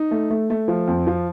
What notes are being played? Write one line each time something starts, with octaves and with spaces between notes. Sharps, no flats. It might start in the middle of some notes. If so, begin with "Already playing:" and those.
Already playing: D#4
A3
A3
A3
F3
F2
F3